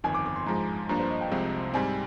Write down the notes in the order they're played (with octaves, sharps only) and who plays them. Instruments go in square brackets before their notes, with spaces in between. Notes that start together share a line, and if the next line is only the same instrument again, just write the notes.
[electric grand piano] G1 F2 D#3 [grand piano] G#5
[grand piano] D6
D6
C6
[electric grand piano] G#2 F3 G#3 [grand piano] A#5
[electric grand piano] G2 F3 A#3 D4 [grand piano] A#5
[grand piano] C5
D#5
G5
[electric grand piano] C2 C3 F3 G#3 C4
[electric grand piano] G#2 G3 C4 [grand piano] G#5